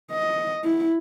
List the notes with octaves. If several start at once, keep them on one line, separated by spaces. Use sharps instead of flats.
D#5
E4